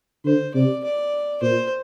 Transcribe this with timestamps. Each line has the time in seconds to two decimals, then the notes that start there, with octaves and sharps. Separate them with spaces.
0.25 D3 C5
0.54 C3 D5
0.84 D5
1.42 A#2 C5